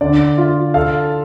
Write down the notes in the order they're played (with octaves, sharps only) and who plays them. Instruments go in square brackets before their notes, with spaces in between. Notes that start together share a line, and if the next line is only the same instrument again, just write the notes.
[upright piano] D3 [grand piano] D5
[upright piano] F4
[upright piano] A4 [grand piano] F5